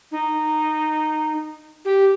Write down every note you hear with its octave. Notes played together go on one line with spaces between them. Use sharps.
D#4
G4